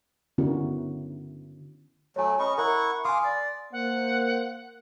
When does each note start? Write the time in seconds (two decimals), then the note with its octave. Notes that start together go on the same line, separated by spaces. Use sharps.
0.38 D3 B3 C#4 E4 F#4 A#4
2.16 F#3 A3 C#5 G#5
2.39 C#4 D#5 B5 C#6
2.58 E4 A#4 F#5 A#5 C#6
3.05 F5 G#5 C6 D6 D#6
3.24 D5
3.72 A#3 C5 F#5